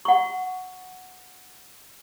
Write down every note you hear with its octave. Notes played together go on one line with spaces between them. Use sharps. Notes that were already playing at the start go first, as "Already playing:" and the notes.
F#5 C#6